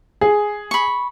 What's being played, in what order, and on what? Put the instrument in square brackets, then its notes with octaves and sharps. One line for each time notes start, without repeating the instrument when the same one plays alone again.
[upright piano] G#4
[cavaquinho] B5 C#6